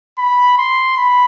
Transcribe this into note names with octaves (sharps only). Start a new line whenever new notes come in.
B5
C6
B5